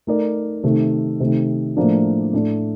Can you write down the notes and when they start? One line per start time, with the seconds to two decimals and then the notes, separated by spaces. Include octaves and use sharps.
0.07 A3 D#4 A#4 D5
0.63 C3 D#3 A3
1.20 C3 D#3 A3
1.77 A2 F3 A#3 D4
2.33 A2 A3 D4